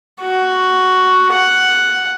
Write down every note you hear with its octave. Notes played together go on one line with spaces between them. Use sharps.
F#4
F#5